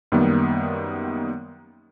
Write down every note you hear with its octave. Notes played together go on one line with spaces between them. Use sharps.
F#2 D#3 G3 A#3 B3